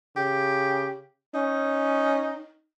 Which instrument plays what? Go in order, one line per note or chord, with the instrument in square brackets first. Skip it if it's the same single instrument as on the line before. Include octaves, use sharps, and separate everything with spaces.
[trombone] C#3 [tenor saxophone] G4
[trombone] C#4 [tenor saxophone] D#4